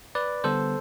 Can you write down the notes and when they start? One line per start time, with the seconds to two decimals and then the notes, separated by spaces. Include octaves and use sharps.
0.15 B4 D5
0.44 D3 G3 B3 A4 C5